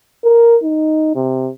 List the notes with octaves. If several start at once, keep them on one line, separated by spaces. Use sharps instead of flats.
A#4
D#4
C3